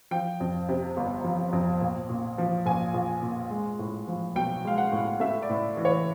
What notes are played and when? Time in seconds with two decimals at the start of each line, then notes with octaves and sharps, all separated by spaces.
0.11 F3 G5
0.40 F2
0.69 C3
0.97 G1
1.24 F3
1.53 F2
1.81 A#1
2.09 A#2
2.38 F3
2.65 A#1 G#5
2.94 A#1
3.22 A#2
3.50 G#3
3.79 A2
4.08 F3
4.36 B1 G5
4.65 G#3 F5
4.78 F#5
4.92 A2
5.20 A3 E5
5.42 D5
5.50 A2
5.77 E3
5.85 C#5